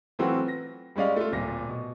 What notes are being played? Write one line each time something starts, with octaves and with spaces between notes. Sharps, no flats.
E3 F#3 A3 C4 F4 F#4
A#6
G3 G#3 C#4 D5 F5
A3 F4
D1 A#2 A#6
B2